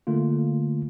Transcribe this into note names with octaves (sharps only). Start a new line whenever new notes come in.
D3 A3 A#3 F4